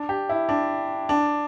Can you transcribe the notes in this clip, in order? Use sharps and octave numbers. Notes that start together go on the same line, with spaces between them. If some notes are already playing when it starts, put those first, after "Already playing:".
Already playing: D4
G4
E4
D4
D4